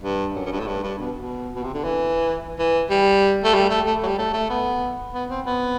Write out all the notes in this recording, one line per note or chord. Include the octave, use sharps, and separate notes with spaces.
G2
F#2
F#2
G2
A2
G2
G2
B2
B2
B2
C3
D3
E3
E3
G3
A3
G3
A3
A3
F#3
G3
A3
A3
B3
B3
C4
B3